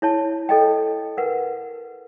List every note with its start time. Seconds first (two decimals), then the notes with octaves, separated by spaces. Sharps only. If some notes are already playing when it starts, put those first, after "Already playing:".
0.02 E4 C#5 A5
0.49 A4 D#5 G5
1.18 A#4 B4 F#5